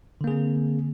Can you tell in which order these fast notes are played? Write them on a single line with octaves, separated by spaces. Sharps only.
D3 A#3 G#4 C4